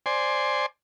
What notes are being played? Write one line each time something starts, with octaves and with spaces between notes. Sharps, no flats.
C5 D5 G#5 C6